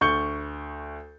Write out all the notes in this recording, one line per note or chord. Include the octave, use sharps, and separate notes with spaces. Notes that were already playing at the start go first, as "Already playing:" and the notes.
D2 C#6 G6 C#7 G7